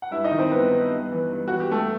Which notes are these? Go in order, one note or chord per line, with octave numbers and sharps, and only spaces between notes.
F#5
G2 E4 E5
D#4 D#5
D#3
C4 C5
G2 B3 B4
D#3
G2
E3
G2
E3 F#4
G4
G2 A3 A4